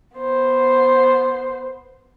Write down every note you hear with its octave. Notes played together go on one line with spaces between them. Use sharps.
B3 C5